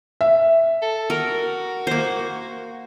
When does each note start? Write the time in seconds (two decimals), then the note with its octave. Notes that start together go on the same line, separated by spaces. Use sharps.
0.21 E5
0.82 A4
1.10 F#4 A#4
1.87 A#3 C5